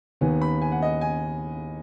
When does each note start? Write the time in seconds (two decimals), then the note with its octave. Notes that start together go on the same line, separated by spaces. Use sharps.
0.21 D#2 D#3 B3 G#5
0.42 B5
0.62 G#5
0.72 F#5
0.82 D#5
1.01 G#5